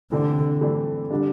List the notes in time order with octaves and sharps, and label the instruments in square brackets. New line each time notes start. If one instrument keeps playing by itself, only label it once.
[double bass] D3 [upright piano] E3 A3 C4 A4 D5
[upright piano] E3 A3 C4 A4 D5
D3 G3 D4